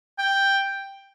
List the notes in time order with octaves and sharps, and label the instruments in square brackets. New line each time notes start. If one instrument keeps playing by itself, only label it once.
[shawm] G5